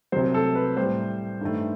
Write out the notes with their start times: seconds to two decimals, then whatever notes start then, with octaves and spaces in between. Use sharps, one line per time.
0.12 C2 C3 F#3 C5
0.34 A4
0.55 B4
0.77 A2 G3 C5
1.41 G2 D#3 A3